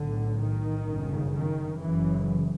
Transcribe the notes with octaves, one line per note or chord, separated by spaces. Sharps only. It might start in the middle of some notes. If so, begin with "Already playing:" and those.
Already playing: B1 A2 D3
D#3
G1 F#2 C#3
D#3
F#1 F#2 C#3 E3